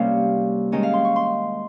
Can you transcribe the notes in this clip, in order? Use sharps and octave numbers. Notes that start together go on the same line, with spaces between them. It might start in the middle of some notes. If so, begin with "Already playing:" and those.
Already playing: C3 G3 A#3 C#4 F5
D#3 G#3 C#4 D#5
F5
C6
C#6
C6